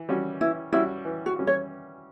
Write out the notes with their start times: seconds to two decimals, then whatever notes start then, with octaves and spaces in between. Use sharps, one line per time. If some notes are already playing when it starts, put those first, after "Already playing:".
Already playing: E3
0.09 G3 C#4 F#4
0.41 E3 E4
0.72 G3 C#4 E4 F#4
1.05 E3
1.26 F#4
1.36 G3 C#4 F#4
1.47 C#5